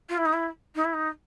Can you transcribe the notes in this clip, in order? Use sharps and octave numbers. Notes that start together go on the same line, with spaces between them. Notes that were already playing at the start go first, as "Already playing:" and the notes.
F4
E4
D#4
E4
D#4
E4
D#4